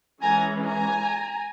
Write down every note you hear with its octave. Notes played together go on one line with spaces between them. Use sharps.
E3 G#3 C#4 G#5 A#5
G#5 A#5